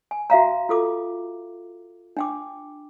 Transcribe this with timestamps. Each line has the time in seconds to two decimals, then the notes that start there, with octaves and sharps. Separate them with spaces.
0.11 G#5
0.30 F#4 E5 F5 A#5
0.69 F4 A4 D6
2.17 D4 G5 D6